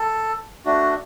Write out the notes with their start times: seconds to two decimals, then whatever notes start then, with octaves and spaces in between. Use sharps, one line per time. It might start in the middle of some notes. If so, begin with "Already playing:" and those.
Already playing: A4
0.65 A3 D4 F#4